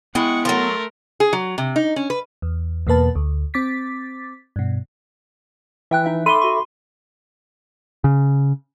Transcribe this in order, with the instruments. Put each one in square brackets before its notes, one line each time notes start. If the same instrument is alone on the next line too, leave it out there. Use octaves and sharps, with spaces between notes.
[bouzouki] G#3 [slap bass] B3 [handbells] E4 G5 [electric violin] F#5 C#6
[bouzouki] F3 F#3 [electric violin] A3 A#4 [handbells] C6 A6
[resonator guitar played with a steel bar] G#4
F#3
C3
D#4
C#4
B4
[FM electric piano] E2
E2 B2 A#3 B4 A5
D2
C4 D6 A6 B6
G2 B2
[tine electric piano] E3 [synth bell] E5 G5 F#6
[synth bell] D#4 E5
[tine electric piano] A4 E5 D6 [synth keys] B5 [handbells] C6 [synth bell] D#7 G7
[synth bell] F#4 C#6
[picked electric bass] C#3